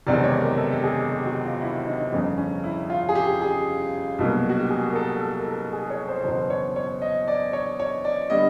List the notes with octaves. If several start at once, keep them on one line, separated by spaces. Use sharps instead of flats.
F#1 E2 C3 D#3 G#3 D5
C#5
A#4
A4
G4
G#4
G4
F#4
F4
E4
D#4
G1 F2 C#3
C#4
E4
F4
G#4
G4
G#4
C2 B2 F#3 A#3
F#4
G4
G#4
A#4
A4
A4
A#4
A4
G#4
C#5
C5
F#1 E2 B2 C5
C#5
C#5
D#5
D5
C#5
C#5
D5
D3 G3 B3 D#5